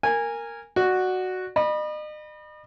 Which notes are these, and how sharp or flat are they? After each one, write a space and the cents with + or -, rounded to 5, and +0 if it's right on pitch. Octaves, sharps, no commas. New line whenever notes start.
A#4 -10 G#5 -15
F#4 +0 D5 +25
D#5 -40 B5 -20